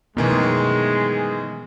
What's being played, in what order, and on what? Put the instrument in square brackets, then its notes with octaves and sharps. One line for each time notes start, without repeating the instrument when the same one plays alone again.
[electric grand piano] F#2 D#3 E3 [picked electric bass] B2 A3 B3 [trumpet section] G#3